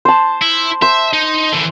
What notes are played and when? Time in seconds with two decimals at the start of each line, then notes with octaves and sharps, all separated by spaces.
0.05 C5 A5
0.42 E4
0.82 C5 E5
1.14 D#4
1.52 D3 E3